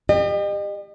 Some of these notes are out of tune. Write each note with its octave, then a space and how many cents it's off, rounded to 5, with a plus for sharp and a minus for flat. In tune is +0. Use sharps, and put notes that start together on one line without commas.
G4 +25 D#5 -40